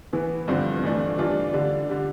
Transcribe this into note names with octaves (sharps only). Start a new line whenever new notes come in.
E3 B3 E4
G2 D3 F3 C4
E3 A3 D4 F4
E3 G3 D4 F4
D3 G3 D4
D3 G3